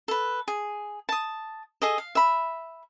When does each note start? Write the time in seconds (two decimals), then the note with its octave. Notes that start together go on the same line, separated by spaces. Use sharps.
0.08 A4 B4
0.48 G#4
1.09 A5 D#6
1.82 G#4 A4 D#5
1.98 F5
2.15 E5 B5